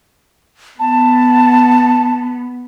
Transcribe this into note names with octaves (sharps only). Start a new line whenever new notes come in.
B3 A5